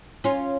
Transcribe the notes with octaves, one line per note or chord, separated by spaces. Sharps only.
C#4 F4